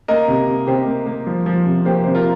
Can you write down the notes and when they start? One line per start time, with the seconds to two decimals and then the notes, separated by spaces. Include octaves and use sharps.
0.08 A#3 A#4 D#5
0.28 C3
0.48 C3
0.67 C3 G4 C5
0.86 A#3
1.06 A#3
1.27 F3
1.46 F3
1.66 C3
1.85 A#3 G4 C5
2.04 C3 C5
2.15 F4 A#4